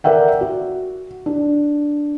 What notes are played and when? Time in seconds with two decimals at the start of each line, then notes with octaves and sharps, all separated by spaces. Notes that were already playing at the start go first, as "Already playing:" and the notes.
0.04 A#4 D5 E5 F#5 G5
0.41 F#4
1.26 D4